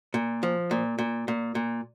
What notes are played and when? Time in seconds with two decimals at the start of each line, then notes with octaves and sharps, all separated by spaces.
0.14 A#2
0.43 F3
0.71 A#2
0.99 A#2
1.28 A#2
1.55 A#2